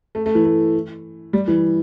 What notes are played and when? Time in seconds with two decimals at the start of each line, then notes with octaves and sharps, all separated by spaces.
0.15 A3
0.26 A3
0.35 E3
0.45 A3
1.33 G3
1.48 E3